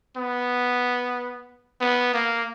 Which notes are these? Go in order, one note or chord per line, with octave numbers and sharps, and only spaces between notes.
B3
B3
A#3